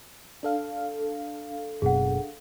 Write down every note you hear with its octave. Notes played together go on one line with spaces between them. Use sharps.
D4 A4 F5
F#1 B2 G#4 F#5